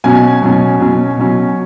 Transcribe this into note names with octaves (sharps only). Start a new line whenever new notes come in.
B2 F#3 C#4 G#5
B2 F#3 C#4
B2 F#3 C#4
B2 F#3 C#4